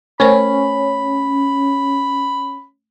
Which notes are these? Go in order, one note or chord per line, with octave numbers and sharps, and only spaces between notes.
A3 C#4 A#4 C5 B5